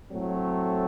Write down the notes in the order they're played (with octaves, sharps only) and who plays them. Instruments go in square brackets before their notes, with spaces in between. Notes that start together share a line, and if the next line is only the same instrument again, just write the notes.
[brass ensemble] A2 F#3 A3 C4